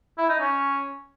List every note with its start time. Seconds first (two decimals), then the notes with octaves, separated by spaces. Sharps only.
0.18 E4
0.29 D#4
0.40 C#4